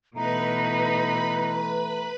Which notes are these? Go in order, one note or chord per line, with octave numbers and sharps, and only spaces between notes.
B2 E3 A3 D#4 B4 A#5 B5